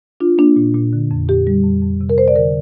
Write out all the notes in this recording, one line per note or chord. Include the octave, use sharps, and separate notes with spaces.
D4 F4
A#3 D4
A#2
A#2
D3
F2
A#2 G4
G3
F2
F2
C3
A#4
F2 C5
D5
D3 A#4